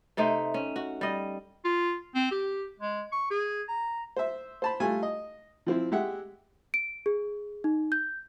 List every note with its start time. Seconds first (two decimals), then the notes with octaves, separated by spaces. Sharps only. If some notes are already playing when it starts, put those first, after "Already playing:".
0.17 C3 A3 D#4 C5
0.54 C#4
0.76 F#4
1.01 G3 D#5
1.65 F4
2.15 C4
2.31 G4
2.80 G#3
3.13 C#6
3.31 G#4
3.69 A#5
4.16 C5 E5
4.62 C5 A5 B5
4.80 G3 A3 F4 G#5
5.03 D#5
5.66 F3 C4 E4
5.92 G#3 G4 E5 F#5
6.74 D7
7.06 G#4
7.64 D#4
7.92 G6